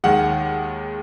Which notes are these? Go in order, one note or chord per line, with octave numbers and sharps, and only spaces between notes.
D#2 D#3 G#3 F#5